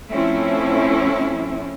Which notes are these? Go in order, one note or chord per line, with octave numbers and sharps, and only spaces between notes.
F3 A3 C4 C#4 E4